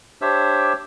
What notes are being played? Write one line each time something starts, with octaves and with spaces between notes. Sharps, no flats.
D4 G4 C5 C#5 E5 E6